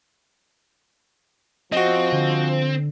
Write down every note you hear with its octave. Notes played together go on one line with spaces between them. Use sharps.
F3 C4 F#4 D#5
D3